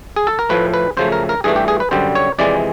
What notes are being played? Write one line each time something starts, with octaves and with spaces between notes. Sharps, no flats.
G#4
A4
A#4
A2 F3 A3 B4
B4
F#2 C#3 F3 A3 C5
A#4
A#4
G2 E3 A3 G#4
G4
G#4
B4
F#2 D3 G3 C5
C#5
F2 C3 E3 G#3 D5